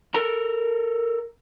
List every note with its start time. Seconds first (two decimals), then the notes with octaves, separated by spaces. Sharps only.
0.14 A4 A#4 A#5